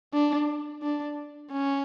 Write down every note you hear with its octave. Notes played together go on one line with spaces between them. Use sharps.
D4
D4
C#4